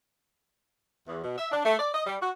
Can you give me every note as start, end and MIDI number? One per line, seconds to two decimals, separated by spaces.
1.08 1.21 40
1.23 1.37 47
1.38 1.50 76
1.52 1.65 62
1.65 1.77 57
1.79 1.91 74
1.94 2.05 75
2.07 2.16 55
2.21 2.31 66